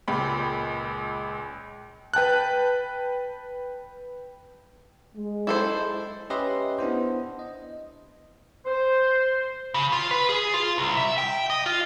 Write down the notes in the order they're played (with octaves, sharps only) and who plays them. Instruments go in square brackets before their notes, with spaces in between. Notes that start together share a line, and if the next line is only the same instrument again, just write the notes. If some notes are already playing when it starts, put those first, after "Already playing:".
[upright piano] C#2 A#2 B5
[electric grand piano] B4 G5 A5 F#6
[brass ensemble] G#3
[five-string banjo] E4 A4 C5
[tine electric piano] C#4 G4 B4 D#5 E5 C6
B3 D4 E4 C5
D#5
[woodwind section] C5
[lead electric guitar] C#3
F4
B4
G#4
F4
C2
E5
G5
D#5
F4